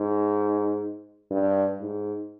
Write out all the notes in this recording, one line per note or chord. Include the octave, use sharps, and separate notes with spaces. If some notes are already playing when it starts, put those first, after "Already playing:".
Already playing: G#2
G2
G#2